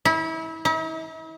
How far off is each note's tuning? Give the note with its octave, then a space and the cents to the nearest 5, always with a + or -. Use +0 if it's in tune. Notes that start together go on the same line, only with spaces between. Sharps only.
E4 -30
E4 -45